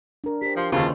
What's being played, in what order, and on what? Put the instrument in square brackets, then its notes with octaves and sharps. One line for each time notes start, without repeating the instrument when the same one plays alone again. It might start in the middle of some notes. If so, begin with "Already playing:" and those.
[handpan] D4 A#4
[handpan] G4 C5 [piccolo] B6
[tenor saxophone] F3 [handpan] F4 G4 [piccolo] C6
[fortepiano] D#2 C#3 [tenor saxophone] F4 [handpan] F#4 B4 C5 [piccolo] A5